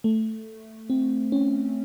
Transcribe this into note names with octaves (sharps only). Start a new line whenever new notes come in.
A3
C4
C#4